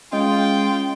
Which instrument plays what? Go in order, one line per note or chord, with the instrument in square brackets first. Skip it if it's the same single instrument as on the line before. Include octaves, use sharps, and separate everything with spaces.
[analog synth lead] G#3 [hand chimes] C#4 D#5 [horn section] F4 G5